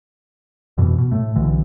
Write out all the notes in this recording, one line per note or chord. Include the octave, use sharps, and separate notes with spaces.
F2 B2 E3
B2
A2 A3
B1 D3 E3